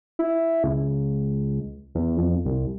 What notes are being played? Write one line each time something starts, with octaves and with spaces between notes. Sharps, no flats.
E4
C#2
E2
F2
C2